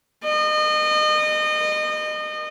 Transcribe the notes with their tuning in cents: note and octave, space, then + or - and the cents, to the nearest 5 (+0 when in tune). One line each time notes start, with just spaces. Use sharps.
D#5 -30